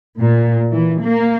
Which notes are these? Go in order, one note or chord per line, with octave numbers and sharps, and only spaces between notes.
A#2
E3
A#3